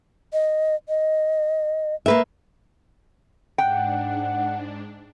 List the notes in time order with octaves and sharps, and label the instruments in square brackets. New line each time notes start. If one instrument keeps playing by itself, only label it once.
[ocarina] D#5
D#5
[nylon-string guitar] A#3 B4 E5
[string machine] G#2 D4 [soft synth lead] F#5 [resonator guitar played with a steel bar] G5